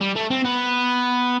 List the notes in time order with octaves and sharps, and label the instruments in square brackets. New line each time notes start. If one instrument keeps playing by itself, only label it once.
[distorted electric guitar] G3
A3
C4
B3